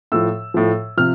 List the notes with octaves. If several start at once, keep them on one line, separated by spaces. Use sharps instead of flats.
A2 F3 E6
A2 F3
C3 F3 F6